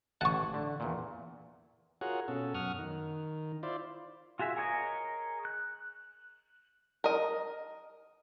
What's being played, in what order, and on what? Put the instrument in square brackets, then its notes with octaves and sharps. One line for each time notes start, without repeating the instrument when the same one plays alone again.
[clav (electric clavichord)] A1 G#5 A5 [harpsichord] F#5 C#6
[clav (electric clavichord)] D3
E2 A#2
[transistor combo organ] F4 F#4 G#4 A#4 C#5 F#5
B2 C#4 A4
F#2 F#5 C#6 D#6 F6
D#3
E4 F4 C5 D5
[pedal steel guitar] F4 F#4 G#4 E5
G#4 A#4 C#5 D#5 G#5
F#6
[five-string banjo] A#4 D#5